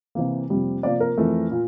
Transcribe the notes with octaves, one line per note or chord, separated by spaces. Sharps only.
C3 E3 A#3
F2 C3 G3 A#3
C3 F3 A#3 D5
A#4
F2 E3 A3
A#2